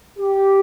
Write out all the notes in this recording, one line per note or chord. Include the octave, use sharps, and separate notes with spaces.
G4